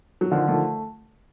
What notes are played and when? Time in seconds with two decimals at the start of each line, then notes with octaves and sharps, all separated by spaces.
0.21 F#3
0.31 D3 D#3 F3
0.47 D#3 F3 A3